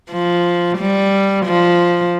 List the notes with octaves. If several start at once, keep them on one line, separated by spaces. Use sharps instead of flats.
F3
G3
F3